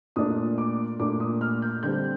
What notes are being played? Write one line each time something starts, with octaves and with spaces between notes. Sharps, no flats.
A#2 A3 D4 D#6
D6
A#2 A3 D4 D6
D#6
F6
G6
D3 G3 C4 G6